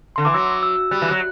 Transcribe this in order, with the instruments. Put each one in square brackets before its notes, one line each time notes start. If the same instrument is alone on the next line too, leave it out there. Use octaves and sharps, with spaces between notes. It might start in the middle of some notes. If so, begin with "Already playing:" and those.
[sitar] D3 [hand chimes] C6
[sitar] E3 [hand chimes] D6
[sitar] F#3 [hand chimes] E6
[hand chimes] E6
[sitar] G3 [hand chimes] F#6
[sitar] E3 [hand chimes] F#6
[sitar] F#3